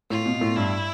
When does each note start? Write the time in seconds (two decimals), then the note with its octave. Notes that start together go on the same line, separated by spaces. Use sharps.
0.10 A2 F4
0.26 B2
0.41 A2
0.56 G2 E4